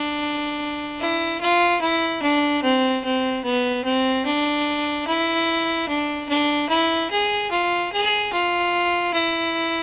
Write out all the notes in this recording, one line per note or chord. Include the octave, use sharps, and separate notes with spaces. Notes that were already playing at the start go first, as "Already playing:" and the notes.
Already playing: D4
E4
F4
E4
D4
C4
C4
B3
C4
D4
E4
D4
D4
E4
G#4
F4
G#4
F4
E4